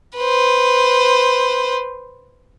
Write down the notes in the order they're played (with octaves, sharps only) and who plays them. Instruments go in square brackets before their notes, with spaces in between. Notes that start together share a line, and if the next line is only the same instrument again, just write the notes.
[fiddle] B4 C5